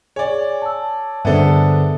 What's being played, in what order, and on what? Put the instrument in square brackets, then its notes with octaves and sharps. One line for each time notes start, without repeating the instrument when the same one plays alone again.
[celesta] G#4 G#5 [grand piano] C#5 D5
[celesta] A5 E6
[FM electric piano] G2 D3 [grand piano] B3 D4 A4 [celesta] G#4 C5 E5